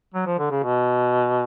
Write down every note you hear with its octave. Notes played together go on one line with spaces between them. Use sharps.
F#3
F3
D3
C#3
B2